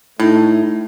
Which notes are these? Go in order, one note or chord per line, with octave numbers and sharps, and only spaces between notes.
A2 A3 D#4